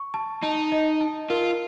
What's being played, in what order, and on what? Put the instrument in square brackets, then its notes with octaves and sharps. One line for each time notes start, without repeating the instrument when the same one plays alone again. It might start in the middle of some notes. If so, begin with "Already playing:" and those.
Already playing: [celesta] C#6
A5
[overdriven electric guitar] D#4 [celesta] A5
[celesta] D#5
A5
[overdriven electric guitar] F4 [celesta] A#4